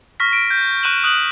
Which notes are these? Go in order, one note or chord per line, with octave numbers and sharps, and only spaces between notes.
C#6 F6 A#6 B6
D7
G6
C#6 F#6 D#7 E7 F#7
D#6 F#6 F#7